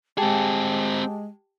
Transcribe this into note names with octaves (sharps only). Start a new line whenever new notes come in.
G#3 C4 G4 G#4 G5 A5